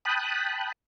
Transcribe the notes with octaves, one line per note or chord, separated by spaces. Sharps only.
G5 A5 B5 D#6 F#6